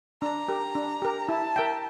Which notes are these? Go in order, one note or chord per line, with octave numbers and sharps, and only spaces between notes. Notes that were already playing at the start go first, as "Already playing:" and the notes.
D4 A#5
G4 A#4
D4
G4 A#4
E4 A5
A#4 E5 G5